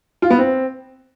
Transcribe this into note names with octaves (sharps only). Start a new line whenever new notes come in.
F4
B3
C4